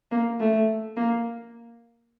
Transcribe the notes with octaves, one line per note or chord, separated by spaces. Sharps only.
A#3
A3
A#3